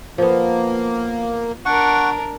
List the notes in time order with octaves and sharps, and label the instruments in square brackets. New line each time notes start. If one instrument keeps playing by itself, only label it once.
[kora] F3 B3 [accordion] A#3
[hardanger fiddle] D4 A#4 [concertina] F#5 C#6